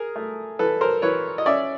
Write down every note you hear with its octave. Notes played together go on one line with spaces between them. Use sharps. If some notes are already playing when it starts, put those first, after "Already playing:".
Already playing: G#4 A#4
A3
E3 A4 B4
A#4 C5
E3 B4 C#5
D#5
C#4 D5 E5